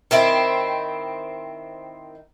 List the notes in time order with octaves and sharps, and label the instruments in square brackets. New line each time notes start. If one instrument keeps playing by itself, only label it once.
[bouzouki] D#3 C4 E4